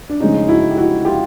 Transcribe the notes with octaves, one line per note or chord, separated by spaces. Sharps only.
D4
C#3 F3 G#3 C#4 D#4
E4 F#4
G4
E4 F#4
F4 G4